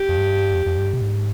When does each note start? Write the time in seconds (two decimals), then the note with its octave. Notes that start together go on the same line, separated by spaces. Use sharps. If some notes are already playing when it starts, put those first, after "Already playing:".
Already playing: G4
0.09 F2
0.17 G2
0.54 F2
0.66 F2
0.78 G2
0.93 B2
1.01 G#2